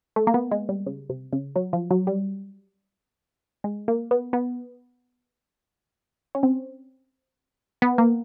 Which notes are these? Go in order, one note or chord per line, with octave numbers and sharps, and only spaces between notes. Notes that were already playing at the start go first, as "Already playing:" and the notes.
A3
A#3
B3
G#3
G3
C#3
C3
C#3
F#3
F3
F#3
G3
G#3
A#3
B3
B3
C#4
C4
B3
A#3